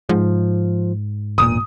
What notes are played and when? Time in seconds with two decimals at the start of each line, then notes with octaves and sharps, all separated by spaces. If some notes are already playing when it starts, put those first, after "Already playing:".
0.09 G#2 F3
1.38 E1 A#2 D#6